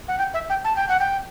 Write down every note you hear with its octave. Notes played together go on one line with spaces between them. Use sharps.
F#5
G5
E5
G5
A5
G5
F#5
G5